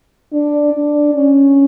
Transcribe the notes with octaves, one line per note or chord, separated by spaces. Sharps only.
D4
D4
C#4